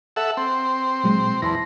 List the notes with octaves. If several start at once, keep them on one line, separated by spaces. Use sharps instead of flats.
A4 E5 F#5
C4
A#2 F#3 G#3
E2 A5 C6 A#6